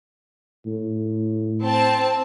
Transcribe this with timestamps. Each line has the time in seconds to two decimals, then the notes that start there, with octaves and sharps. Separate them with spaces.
0.66 A2
1.63 C4 A5